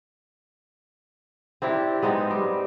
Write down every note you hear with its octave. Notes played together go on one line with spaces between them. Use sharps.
C4 D4 E4 G4
G#3 B3 C4 D#4
G3